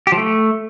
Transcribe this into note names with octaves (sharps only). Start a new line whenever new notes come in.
G4
F3
A3